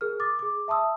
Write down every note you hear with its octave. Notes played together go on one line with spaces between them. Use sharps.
G#4 A#4 F6
D6 D#6 A6
G#4 D6
E5 A5 C6 D#6 E6